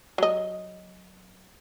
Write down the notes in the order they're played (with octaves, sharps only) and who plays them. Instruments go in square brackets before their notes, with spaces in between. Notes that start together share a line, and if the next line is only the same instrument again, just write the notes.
[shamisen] F#3 D#5